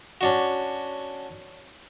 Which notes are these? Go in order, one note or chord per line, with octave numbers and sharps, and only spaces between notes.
C#4 D4 F#4